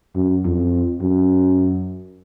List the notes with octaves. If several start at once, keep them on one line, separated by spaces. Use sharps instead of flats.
F#2
F2
F#2